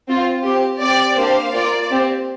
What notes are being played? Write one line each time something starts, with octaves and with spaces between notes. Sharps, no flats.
C4 F4
C4 G4
C4 G4 D5
A#3 D4 G4 C5 F5
A#3 F4 D5
C4 G4